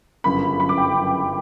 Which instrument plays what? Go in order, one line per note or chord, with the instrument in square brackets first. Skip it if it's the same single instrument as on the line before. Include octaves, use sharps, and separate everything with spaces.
[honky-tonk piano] G1 F#2 C#3 B5
B5
D6
G5